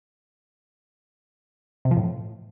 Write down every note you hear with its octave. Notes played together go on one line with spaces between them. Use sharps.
C3
F3
A2